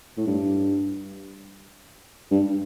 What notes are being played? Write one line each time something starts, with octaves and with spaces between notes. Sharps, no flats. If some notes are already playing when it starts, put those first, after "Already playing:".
A2
G2
G2